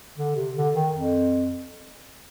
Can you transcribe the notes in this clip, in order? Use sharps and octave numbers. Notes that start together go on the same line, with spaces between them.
D3
C3
D3
D#3
F2